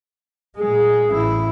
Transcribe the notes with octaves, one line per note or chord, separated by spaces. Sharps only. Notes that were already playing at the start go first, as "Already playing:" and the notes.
A#2 G#3 G#4
A1 E4